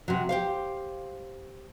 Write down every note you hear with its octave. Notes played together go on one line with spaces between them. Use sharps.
C3 F#3
G4 C5 F5